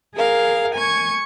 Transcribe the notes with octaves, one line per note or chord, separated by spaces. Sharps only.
G#4 A#4 F5
G#5 C#6 G#6